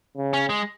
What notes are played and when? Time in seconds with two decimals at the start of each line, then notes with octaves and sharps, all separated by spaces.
0.17 C#3
0.33 C#4
0.50 G#3